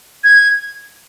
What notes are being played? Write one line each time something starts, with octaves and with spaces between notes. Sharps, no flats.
G#6